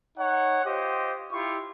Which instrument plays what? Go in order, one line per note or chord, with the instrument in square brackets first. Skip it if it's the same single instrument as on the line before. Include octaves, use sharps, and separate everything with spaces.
[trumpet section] D#4 C#5 F#5
F4 G4 C5 D#5
E4 F4 G4 C#6